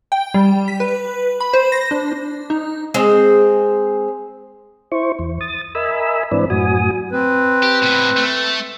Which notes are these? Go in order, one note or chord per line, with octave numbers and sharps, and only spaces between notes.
G5
G3
B6
B4
B5
C5
A#6
D4
D4
D#4
G#3 C4 C5
E4 C5 C#6
E2
D#6 A6
A#4 D#5 E5 G#5 B5 E6
G#2 E3 C4 D4 B4 D5
F#2 A2 F#4 G#5 D#6
C4 B4
G4
A2 B3
A3